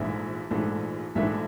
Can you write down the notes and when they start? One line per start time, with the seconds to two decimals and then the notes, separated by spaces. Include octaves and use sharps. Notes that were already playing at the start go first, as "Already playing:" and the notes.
Already playing: A#1 G#2 E3 A3 D4 E5
0.51 A#1 G#2 E3 A3 D4
1.15 A#1 G#2 E3 A3 D4 E5